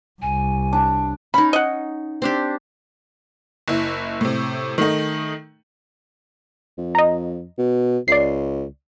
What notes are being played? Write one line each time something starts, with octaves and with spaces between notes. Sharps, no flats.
C2 G#5
D4
C#4 D#4 B5
D#5 F#5
C4 D4 G4
F#1 E4
A2 C3
D#3 A3 D#4
F2
D#5 A#5
B2
C#2 D5 C7